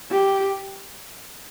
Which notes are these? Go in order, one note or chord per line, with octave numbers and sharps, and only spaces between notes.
G4